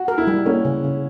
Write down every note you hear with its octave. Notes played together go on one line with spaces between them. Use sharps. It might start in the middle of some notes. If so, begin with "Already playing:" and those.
Already playing: F#4
A#4
E4
G3
A#3 C#4
C#3
C#3